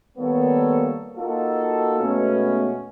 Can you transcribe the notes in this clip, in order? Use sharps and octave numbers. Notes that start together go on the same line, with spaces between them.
D#3 G3 A#3 B3 A4 C#5
A#3 D#4 F4 F#4 A4
B2 G#3 A3 B3 C#4